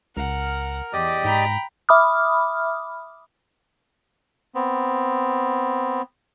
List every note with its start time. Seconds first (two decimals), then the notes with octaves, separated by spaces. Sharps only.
0.17 C#2 A#4 F#5 F6
0.93 E2 G4 D5 D#5
1.25 G#2 G5 A#5 B5
1.89 E5 B5 D6 D#6 F6
4.55 B3 C4